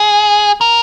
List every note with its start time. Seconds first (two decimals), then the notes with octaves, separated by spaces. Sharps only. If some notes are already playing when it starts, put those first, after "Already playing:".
Already playing: G#4
0.61 A#4